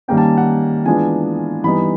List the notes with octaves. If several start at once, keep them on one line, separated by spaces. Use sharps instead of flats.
D#3 G3 A#3 C#4 G5
A5
F#5
E3 G#3 B3 D4 F4 G#5
E3 G3 B3 D#4 B5